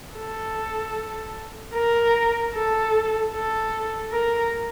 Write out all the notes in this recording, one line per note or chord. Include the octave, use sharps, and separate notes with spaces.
A4
A#4
A4
A4
A#4